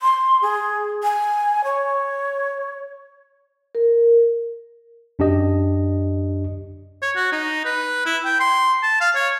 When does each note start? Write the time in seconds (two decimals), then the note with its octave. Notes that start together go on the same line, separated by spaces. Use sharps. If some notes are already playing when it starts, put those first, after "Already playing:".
0.02 C6
0.42 G#4
1.03 G#5
1.64 C#5
3.75 A#4
5.19 F#2 D4 G4 D#5
7.02 C#5
7.16 F#4
7.32 D#4
7.65 B4
8.06 E4
8.25 G5
8.40 C6
8.83 A5
9.01 F5
9.15 C#5